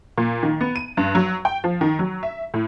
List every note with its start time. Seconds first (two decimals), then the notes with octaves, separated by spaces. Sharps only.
0.18 A#2
0.43 D#3
0.61 B3
0.76 D#7
0.97 G2
1.15 F#3
1.45 G5
1.64 F3
1.81 D#3
1.99 F#3
2.23 E5
2.54 A2